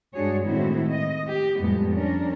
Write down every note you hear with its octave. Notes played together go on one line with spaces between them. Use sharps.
G2 G#3 D4 F#4 G#4 C#5
A2 D#3 G#3 C4 E4 F#4
D#5
G4
F2 A2 G3 G#3 B3
F3 C#4 D4 A#4